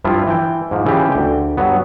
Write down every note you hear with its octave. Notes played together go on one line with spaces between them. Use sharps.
G2 F3 G3 E4 F4
E3 G5
G#2 F3
C#3 E3 G#3 F4 G4
D2 G5
G2 F#3 B3